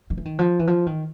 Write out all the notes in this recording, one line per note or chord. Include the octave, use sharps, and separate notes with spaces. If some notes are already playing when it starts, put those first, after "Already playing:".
D#3
E3
D#3
F3
E3
F3
D#3